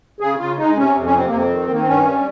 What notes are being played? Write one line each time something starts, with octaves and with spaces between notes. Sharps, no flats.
C#3 G#4
C#3 F4
G#3 D#4
C3 C#4
F2
C#4
C3 C4
A#3
F2 C4
D#3
D#3 A#3
C4
G2 C#4
G3